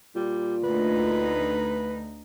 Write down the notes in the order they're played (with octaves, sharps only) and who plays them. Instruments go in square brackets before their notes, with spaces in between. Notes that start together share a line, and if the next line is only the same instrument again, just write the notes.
[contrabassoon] A#2 [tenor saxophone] G3
[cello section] D2 D#4 [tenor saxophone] B4